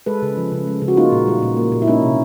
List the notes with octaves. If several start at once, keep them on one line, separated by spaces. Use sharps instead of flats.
G#3 A4 B4
C#3
F3
C#3
G#3
C#3
F#4
A#3 D#4 F4
A#2
G3
A#2
A#3
A#2
E4
A#3 C#4 D#4
C3